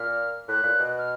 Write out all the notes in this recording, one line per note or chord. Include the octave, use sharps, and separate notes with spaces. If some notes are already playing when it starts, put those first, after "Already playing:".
Already playing: A#2 F6
A2 F#6
A#2
B2
F6